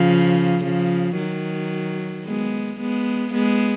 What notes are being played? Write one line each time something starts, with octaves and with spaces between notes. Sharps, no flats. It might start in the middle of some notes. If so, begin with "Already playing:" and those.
Already playing: C#3 F3
C#3 F3
D#3 F#3
G#3 B3
G#3 B3
G#3 B3